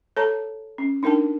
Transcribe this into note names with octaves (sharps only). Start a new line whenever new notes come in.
A4 C#5 A5 A#5
C#4
D4 D#4 A#4 G5 A5